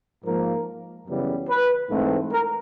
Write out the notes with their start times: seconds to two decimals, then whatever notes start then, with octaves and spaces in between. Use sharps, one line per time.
0.25 G#2 F3 A#3 A#4
1.08 F#2 C#3 E3 G3 B3
1.48 B4
1.90 G#2 E3 A3 C4
2.31 A#4